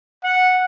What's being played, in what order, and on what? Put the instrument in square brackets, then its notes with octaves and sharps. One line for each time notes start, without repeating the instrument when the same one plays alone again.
[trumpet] F#5